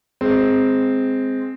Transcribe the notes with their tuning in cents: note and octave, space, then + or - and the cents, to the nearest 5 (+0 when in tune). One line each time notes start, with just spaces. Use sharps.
G#3 +0 C4 -5